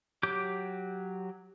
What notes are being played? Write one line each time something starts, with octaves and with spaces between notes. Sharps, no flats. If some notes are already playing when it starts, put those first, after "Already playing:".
F#3 G4 D6 G6